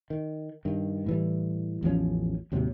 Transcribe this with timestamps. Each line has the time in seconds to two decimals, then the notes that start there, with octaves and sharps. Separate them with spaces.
0.10 D#3
0.65 G2 D#3
1.06 A2 E3 G3
1.83 A1 E2 F3 C#4
2.52 D#2 A2 C3 F#3